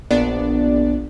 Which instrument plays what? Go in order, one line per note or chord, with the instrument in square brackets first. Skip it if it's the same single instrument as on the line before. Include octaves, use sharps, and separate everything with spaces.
[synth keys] A#1 B3 D4 D5